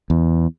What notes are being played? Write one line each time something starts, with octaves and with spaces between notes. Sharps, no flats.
E2